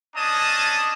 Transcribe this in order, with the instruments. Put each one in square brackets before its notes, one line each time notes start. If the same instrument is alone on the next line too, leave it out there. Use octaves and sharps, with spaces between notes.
[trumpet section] C#4 D4 D#5 A5 D#6